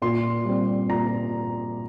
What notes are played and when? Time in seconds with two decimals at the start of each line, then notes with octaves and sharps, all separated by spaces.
0.02 A#2 C6
0.45 G3 C4
0.89 A#2 A#5